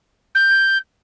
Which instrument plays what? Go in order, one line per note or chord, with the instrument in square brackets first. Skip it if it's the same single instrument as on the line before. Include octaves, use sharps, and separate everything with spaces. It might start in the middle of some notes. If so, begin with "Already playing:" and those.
[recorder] G6